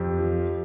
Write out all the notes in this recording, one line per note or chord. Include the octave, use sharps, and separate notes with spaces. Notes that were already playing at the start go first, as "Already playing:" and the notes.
Already playing: F2 G4
F3